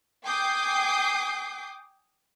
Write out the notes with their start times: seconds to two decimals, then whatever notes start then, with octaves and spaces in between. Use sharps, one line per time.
0.24 G5 G#5 D6 D#6 G6 C7